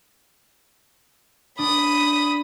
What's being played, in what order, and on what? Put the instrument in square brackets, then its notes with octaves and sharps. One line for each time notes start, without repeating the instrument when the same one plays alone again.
[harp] D4 [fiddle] B5 D#6